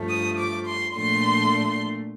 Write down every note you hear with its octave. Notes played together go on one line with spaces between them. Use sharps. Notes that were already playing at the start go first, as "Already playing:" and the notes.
Already playing: G2 F3 A3
D#6
D6
C6
A#2 F3 A3 D4 C6